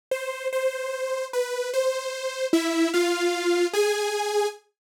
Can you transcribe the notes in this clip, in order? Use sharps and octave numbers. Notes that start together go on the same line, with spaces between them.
C5
C5
B4
C5
E4 E5
F4 F5
G#4 G#5